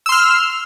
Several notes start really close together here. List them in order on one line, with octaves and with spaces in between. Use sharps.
E6 C6 F6